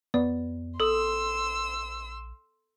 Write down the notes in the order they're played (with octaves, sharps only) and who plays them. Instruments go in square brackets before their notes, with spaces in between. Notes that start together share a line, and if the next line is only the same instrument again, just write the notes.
[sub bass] F2 [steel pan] B3 [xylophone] D5
[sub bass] A#1 [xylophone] A4 D#6 [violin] C6 E6